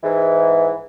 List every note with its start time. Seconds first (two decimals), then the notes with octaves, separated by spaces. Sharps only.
0.03 G#2 E3